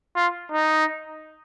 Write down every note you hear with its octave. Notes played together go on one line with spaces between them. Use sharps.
F4
D#4